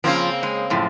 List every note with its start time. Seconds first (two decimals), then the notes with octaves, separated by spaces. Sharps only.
0.04 C#3 F3 A#3 C4 F4
0.43 G#3
0.70 F#2 A2 F3